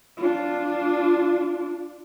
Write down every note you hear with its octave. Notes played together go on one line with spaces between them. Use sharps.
D4 F4